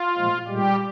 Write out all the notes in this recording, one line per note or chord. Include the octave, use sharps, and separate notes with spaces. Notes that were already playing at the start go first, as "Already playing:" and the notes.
Already playing: F4
A#2 F3 G#3
A#2 G3 G#3 G4